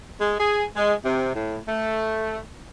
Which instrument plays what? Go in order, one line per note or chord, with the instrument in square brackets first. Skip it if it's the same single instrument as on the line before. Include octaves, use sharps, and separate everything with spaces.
[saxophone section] G#3
G#4
G#3
C3
A2
A3